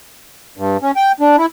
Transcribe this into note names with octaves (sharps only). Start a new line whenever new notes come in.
G2
C#4
G5
D4
E4